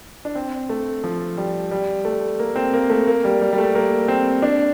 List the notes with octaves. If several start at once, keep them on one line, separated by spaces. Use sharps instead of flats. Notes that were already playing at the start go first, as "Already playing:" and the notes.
D4
C4
A3
F3
G3
G3
A3
A#3
C4
A#3
A3
A#3
G3
G3
G3
A3
A#3
C4
D4